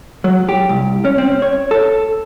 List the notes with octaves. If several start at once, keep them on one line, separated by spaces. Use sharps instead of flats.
F#3
G4
C2
C#4
C4
C#5
A4